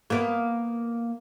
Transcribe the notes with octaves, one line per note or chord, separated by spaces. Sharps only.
A#3 B3